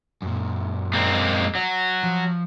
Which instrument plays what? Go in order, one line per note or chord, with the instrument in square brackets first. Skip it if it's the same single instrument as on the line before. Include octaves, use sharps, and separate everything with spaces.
[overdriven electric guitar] F#2 A#2
[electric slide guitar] G#3 A#3 C4
F#3
[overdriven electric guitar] F3